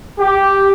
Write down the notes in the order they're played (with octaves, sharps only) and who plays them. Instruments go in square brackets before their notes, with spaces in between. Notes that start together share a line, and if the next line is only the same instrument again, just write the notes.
[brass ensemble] G4